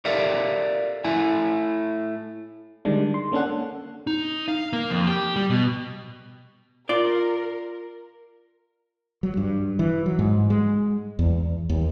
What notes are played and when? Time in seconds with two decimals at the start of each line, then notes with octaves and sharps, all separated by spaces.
0.05 G4 A4 A#4 D5 E5 F5
1.04 A3 E4 G#5
2.85 D3 D#3 G3 G#3 D4
3.14 C6
3.32 A#3 C#4 D4 A4 F#5
4.07 D#4
4.48 F5
4.73 A#3
4.90 F2
5.07 G4
5.36 G3
5.50 B2
6.89 F4 A#4 D5
9.23 F#3
9.37 G2
9.79 E3
10.06 F#3
10.19 G#2
10.50 G#3
11.19 E2
11.69 D#2